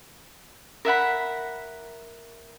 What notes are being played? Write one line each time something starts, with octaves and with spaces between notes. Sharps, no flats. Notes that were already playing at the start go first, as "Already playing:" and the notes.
A#4 E5 F#5 B5